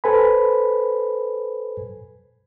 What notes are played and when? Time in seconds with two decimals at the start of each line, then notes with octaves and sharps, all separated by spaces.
0.04 A4 B4 C5 G#5 B5